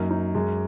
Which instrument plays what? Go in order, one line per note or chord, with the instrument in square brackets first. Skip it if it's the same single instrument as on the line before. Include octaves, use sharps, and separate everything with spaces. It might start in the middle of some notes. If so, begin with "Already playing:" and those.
Already playing: [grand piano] F#2 [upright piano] A#3 D#4
[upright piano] D#4
[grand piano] F#2 [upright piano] G#3